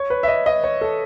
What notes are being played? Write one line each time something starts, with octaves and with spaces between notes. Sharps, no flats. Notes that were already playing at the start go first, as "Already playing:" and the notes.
Already playing: C#5
B4
E5
D#5
D#5
C#5
A4